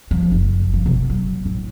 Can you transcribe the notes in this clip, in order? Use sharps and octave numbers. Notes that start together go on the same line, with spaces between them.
F3
F#1
F3
B2
F#3
A2